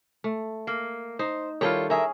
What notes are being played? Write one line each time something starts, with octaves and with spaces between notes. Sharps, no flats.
A3
A#3
D#4 C5
D#3 G3 E4 F4 A4 C#5
C#4 G#4 A#4 E5